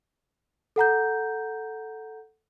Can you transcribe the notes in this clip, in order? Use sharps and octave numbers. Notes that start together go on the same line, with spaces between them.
A4 F#5 A#5 G6